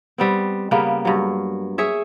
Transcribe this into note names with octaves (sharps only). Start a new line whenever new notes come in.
G3 B3 C4
C#3 G3 A#3 B3
G2 F#3
G#4 C#5 E5